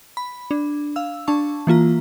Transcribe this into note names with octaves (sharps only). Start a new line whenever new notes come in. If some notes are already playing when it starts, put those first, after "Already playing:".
B5
D4
F5 E6
D4 A5 C#6
E3 A#3 F4 A#5